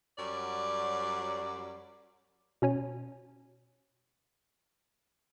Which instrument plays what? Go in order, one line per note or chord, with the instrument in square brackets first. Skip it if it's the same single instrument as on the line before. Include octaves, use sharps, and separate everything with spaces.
[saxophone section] F#2 F#3 G3 D5
[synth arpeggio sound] B2 C#4 C#5 G#5